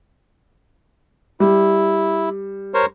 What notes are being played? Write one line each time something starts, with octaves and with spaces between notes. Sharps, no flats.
G3 E4
A#4 C5 C#5